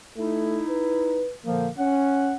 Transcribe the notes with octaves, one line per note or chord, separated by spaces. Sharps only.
A3 D#4 E4
B4
A#2 D3 F3 A#3
C#4 F#5